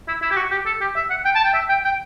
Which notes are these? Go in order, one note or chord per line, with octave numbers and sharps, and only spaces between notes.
E4
E4
G4
F#4
G4
A4
G4
E5
F#5
G5
A5
G5
E5
G5
G5